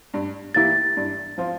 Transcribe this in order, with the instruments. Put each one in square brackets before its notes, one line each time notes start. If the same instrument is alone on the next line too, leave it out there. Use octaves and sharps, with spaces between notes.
[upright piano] G2
[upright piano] E3 A#3 E4 G4 [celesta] A6
[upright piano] G2
F3 C4 F4